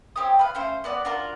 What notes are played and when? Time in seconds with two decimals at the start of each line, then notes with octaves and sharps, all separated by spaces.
0.16 C4 G4 C#5 D#6
0.39 B4 F5
0.55 A3 C#4 C5 F5
0.84 B3 F#4 D5
1.05 D4 F4 F#4 A#4